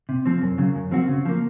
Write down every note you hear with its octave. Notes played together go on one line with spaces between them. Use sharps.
C3
F3 C4
F#2
C#3 F#3
F#2
F3 C4 F#4
C#3
F3 A#3